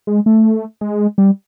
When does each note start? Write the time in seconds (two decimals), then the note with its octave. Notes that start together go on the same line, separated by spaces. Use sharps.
0.07 G#3
0.26 A3
0.81 G#3
1.18 G3